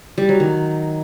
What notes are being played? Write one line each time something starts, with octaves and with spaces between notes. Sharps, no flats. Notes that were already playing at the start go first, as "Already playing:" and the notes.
G3
F#3
D#3